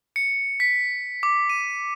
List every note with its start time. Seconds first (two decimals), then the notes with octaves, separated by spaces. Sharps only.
0.16 C#7
0.60 B6
1.23 D6
1.50 D#7